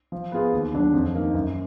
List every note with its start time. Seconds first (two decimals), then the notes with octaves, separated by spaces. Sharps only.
0.12 F3
0.32 B3 F4 G#4
0.52 D#2
0.73 D3 F#3 D4
0.94 F2
1.15 D#3 A#3 D#4
1.34 F#2